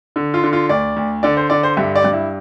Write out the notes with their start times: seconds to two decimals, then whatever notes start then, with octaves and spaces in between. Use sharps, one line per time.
0.16 D3
0.34 F4
0.44 D3
0.53 F4
0.69 D2 D5
0.96 D2
1.23 D3 D5
1.37 C5
1.50 D3 D5
1.63 C5
1.76 G2 E5
1.96 D5
2.04 G2
2.13 E4